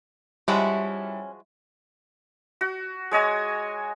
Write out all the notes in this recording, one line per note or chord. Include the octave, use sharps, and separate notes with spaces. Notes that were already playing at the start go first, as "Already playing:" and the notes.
F3 G3 G#3 C#4 E4 F#4
F#4
G#3 C#5 D#5 G#5